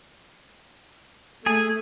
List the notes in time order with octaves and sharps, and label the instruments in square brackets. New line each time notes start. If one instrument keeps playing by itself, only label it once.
[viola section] A3 [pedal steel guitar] G#4 G#5